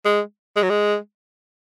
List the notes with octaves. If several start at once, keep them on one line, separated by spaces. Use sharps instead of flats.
G#3
G#3
F#3
G#3